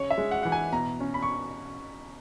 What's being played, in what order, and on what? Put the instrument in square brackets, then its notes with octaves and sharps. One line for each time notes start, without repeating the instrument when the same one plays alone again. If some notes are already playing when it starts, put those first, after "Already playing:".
Already playing: [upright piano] C#3 C#5
E5
G#3
F#5
E3 F#5
G#5
B2 A#5
C#4
B5
C#6